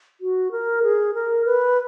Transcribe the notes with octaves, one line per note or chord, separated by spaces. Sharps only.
F#4
A#4
G#4
A#4
B4